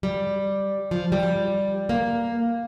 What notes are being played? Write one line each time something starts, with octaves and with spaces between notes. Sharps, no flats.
G3
F3
G3
A#3